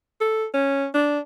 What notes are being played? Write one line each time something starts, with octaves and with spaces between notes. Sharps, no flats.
A4
C#4
D4